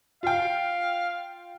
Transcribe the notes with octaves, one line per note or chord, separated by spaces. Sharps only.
F4 F5 G5